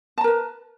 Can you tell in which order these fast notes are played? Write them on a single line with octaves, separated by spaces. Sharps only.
A5 A#5 A#4 B4